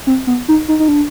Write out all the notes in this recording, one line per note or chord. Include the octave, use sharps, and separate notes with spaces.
C4
B3
D#4
D#4
D#4
D4